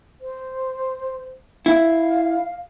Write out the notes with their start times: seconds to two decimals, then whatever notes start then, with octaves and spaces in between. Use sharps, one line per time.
0.21 C5
1.66 E4 F5